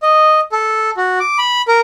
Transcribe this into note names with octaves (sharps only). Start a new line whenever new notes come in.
D#5
A4
F#4
D6
B5
A#4